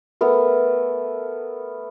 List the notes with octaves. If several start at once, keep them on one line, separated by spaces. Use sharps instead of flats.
A3 B3 A#4